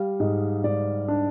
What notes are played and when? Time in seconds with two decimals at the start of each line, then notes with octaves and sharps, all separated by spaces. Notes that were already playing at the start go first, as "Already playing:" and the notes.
Already playing: G3 F5
0.20 G#2 D#5
0.64 G#2 D5
1.08 D4